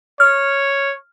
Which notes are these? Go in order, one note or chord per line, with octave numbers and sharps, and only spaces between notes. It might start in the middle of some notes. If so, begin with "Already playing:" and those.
C#5 F6